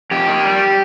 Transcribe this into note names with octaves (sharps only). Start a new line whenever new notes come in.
F2 G4
D#3
G3